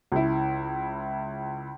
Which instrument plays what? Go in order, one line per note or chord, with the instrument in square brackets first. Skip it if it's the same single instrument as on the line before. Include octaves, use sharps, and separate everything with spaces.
[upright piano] C#2 E4